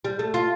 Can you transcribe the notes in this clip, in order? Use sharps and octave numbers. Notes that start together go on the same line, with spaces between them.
G3
A3
F4